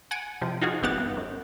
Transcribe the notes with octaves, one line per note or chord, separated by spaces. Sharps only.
F#5 G#5 D7 D#7
C3 F3
D#4 F4 F#4 G#4
G#1 E3 B3 G4 F#5 A6
G2
F#2